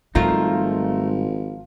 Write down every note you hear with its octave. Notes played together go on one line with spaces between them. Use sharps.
G#1 G#2 F3 G3 A3 D#4 F4 A#4